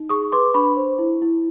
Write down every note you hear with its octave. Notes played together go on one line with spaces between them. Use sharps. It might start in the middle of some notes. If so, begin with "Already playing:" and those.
Already playing: D#4
G#4 C#6 D#6
B4 C6 D6
D4 B5 C#6
C5
E4
E4